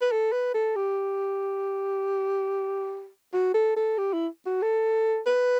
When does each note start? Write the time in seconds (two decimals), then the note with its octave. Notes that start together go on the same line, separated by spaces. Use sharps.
0.01 B4
0.11 A4
0.32 B4
0.54 A4
0.76 G4
3.33 F#4
3.54 A4
3.76 A4
3.98 G4
4.13 E4
4.46 F#4
4.62 A4
5.26 B4